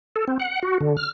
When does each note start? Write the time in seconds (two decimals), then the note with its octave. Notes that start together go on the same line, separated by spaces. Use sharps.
0.16 A4
0.28 C4
0.40 F#5
0.63 F#4
0.81 D3
0.97 F6